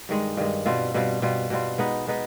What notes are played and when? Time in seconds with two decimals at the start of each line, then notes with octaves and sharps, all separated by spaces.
0.09 G2 D#3 G#3
0.37 G2 D#3 G#3
0.66 B2 G3 C4 F4
0.94 B2 G3 C4 F4
1.22 B2 G3 C4 F4
1.50 B2 G3 C4 F4
1.78 G#3 B3 D#4 B4
2.07 G#3 B3 D#4 B4